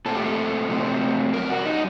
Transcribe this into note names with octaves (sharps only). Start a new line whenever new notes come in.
A#2 A3 C4 A4
G4
A4
C3 F#3 A3 C4
F#2 D#3 G3 A#4
F#4
D#4